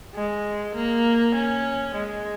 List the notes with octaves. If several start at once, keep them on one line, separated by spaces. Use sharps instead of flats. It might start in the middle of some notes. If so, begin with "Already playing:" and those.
G#3
A#3
C#4
G#3